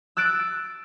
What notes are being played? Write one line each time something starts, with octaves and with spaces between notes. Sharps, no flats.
E6 F#6 A6 D7